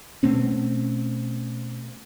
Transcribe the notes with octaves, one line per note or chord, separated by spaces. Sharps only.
B2 A3 C4 C#4